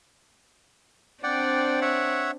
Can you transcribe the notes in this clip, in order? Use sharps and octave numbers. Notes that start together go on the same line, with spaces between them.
C4 D4 C5 D5 F#5 G5
C#5 E5 F#5